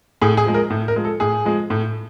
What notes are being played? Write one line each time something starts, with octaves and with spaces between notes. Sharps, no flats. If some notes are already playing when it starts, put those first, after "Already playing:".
A2 G#4
G#4
F3 G#3
A#4
A2
A#4
F3 G#3
A4
A2 G#4
F3 G#3
A2